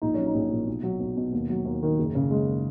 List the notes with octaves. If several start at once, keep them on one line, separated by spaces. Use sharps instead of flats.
A#1 D#4
F#3 C#4
D#4
A#1
A#2
B1
F#3
B1
B2
D#2
F#3
D#2
D#3
F#1
C#3
G#3